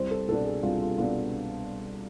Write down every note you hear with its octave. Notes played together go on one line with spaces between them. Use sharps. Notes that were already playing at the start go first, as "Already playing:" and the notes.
Already playing: C2 C5
A4
B2 B3 D4 A4
G#4
C2 F4
F4
B2 B3 D4 F4